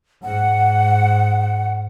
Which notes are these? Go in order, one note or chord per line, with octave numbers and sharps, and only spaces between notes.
G#2 F#5